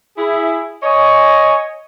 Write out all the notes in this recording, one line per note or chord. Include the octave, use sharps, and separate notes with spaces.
E4 G#4
C#5 D#5 G#5